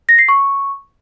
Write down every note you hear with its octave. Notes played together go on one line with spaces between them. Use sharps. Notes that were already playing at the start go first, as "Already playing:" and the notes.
A#6
C7
C#6